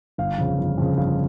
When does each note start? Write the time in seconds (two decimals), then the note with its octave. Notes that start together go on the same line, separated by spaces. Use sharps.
0.18 G1 F5
0.38 F2 C#3
0.58 G1
0.78 F2 C#3
0.98 G1 F5